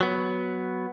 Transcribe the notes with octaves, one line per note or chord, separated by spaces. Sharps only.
F#3 B3